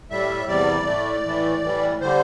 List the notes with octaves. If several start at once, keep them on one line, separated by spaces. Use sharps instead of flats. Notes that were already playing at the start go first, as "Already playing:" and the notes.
A2 G3 E5
E2 C3 G3 D5
A2 A3
A2 E3 A3
A2 E3 G3
D3 G3 C5